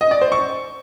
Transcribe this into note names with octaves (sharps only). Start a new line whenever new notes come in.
D#5
D5
C5
C#6